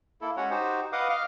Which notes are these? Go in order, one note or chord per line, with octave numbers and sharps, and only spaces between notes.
A#3 E4 A4
G#3 C#4 F#4 C#5 F#5
D#4 F#4 G4 C5
B4 D#5 F5 F#5 D6 D#6
D#5 F5 D6 F6